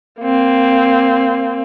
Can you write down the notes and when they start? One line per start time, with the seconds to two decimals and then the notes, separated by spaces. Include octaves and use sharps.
0.21 A#3 C4